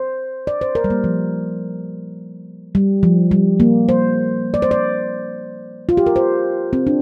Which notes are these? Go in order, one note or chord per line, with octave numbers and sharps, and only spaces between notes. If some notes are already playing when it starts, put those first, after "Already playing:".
Already playing: C5
D5
C5
A#4
G3
A#3
F3
G3
F3
G3
A#3
C5
D5
C5
D5
F4
G4
A#4
C5
C4
D4